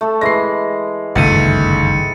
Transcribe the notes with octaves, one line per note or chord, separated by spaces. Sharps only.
A3 A4
E3 G#3 A#6 C7
G1 C#2 F#2 D#3 A3 A6 C#7 D#7